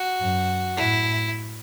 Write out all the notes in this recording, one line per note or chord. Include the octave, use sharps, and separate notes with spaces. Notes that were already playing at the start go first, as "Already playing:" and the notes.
Already playing: F#4
F#2
A2 E4